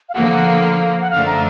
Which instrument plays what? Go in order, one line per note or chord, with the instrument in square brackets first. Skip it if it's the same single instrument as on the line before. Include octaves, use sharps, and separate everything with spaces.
[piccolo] F5
[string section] D3 F3 A#3 [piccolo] F#5
[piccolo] F#5
F5
F#5
[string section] F#2 D3 F3 A3 D4 [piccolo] F5
[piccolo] A#5